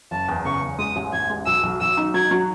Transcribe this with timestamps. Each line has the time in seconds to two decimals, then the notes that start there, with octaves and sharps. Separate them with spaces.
0.11 F#1 A5
0.28 E2
0.45 C#3 C#6
0.62 E2
0.78 G#3 D#6
0.96 A1
1.13 A1 G#6
1.30 G#3
1.46 B1 E6
1.63 B1
1.81 B1 E6
1.97 D#4
2.14 F#3 G#6
2.31 F#3